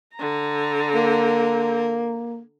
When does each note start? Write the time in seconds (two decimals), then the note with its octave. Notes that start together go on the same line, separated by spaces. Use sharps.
0.16 D3 A#5
0.95 A#3